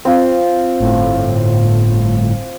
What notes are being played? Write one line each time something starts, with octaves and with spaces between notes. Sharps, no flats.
C4 F4
G1 A2